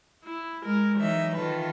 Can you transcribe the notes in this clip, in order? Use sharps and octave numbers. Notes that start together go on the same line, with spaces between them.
E4
G#3 A#4
E3 F#3 D#4 E5
D#3 E3 F4 A4 B4